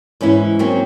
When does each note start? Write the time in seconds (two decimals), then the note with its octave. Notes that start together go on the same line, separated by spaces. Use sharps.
0.21 G#2 E3 C#4 E4
0.59 F#3 A#3 C4 C#4